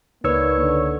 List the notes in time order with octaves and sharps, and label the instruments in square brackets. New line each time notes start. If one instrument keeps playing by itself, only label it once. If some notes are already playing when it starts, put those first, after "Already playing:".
[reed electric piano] C#2 E6 [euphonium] A#3 [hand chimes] D#4 B4 D5 [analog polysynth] C#5
[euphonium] D3